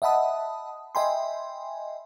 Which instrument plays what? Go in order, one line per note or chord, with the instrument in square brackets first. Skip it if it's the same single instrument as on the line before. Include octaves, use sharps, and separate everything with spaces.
[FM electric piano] D#5 E5 F#5 A5 B5 D#6
D#5 E5 G5 G#5 B5 C6